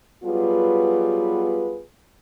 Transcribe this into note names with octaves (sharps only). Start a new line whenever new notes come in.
F#3 G3 B3 F4 G#4 B4